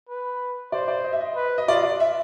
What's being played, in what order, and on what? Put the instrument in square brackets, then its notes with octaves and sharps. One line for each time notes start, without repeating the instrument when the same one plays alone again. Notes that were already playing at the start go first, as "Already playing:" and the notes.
[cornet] B4
[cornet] C5 [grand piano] D5
[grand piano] D5
D#5
E5
D#5
[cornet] B4
[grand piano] D#5
[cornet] F4 [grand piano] D5
[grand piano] D5
E5